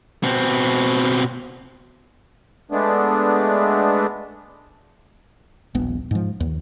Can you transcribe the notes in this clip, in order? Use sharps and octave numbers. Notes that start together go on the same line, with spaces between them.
B2 C4
G#3 A3 B3 D4
D#1 A#1 B3
G#2 F3
D#2